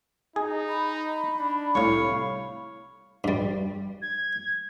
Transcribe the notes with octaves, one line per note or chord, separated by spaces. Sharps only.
D#4 G#4
B5
D4
C2 A2 C#5 F5
G2 G3
G#6